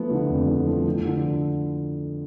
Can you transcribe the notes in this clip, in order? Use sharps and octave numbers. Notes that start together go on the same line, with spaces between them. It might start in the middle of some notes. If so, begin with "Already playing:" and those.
Already playing: F3 A3 B3
D3
F2
A3
F3
F3
D3